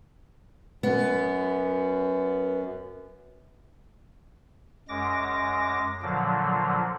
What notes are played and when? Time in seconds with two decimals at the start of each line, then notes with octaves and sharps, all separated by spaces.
0.83 F#2 B3
4.88 F#2 G#3 D6 A#6
6.02 A#2 D3 F3 F#3